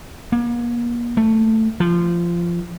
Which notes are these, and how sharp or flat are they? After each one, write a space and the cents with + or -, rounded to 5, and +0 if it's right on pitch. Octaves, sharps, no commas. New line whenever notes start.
A#3 +40
A3 +10
F3 -20